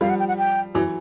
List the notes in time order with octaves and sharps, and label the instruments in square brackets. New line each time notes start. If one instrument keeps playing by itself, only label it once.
[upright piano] F3 G3 [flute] F5
[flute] F#5
G5
F#5
G5
[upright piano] E3 F#3